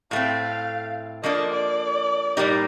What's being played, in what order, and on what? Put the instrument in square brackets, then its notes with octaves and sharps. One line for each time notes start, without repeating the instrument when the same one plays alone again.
[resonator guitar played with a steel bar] A2 A3 C4 [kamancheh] F5
[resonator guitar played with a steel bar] F3 A#3 D4 A4 [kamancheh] D#5
[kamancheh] D5
[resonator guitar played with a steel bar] A2 G3 A#3 D#4 G4